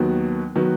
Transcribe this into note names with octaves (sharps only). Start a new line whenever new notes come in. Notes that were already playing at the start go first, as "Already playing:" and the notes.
Already playing: D#2 D#3 F#3 B3 F#4
D#3 F#3 B3 F#4